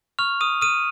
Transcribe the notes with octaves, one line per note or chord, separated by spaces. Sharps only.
C#6 F6 F7
D#6 D#7
D#6 F6 D#7